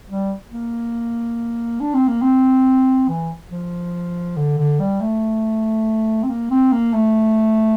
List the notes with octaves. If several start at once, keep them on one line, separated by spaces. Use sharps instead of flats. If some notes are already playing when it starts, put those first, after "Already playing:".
G3
A#3
D4
C4
A#3
C4
E3
F3
D3
D3
G3
A3
C4
A#3
C4
A#3
A3